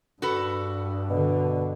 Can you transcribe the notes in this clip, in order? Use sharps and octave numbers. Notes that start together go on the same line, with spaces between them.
G2 F#4 A4 B4
B2 D3